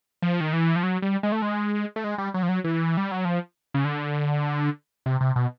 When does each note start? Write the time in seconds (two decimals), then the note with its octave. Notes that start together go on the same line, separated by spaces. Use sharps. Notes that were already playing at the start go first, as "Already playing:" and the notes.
0.22 F3
0.41 D#3
0.53 E3
0.76 F3
0.83 F#3
1.02 G3
1.23 G#3
1.32 A3
1.42 G#3
1.96 A3
2.04 G#3
2.18 G3
2.34 F#3
2.43 F3
2.49 F#3
2.64 E3
2.97 G3
3.12 F#3
3.25 F3
3.74 C#3
3.85 D3
5.06 C3
5.21 C3
5.36 B2